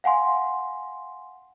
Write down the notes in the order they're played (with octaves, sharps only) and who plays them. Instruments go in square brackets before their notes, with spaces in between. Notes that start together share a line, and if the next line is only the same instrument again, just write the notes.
[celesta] F5 F#5 G#5 C6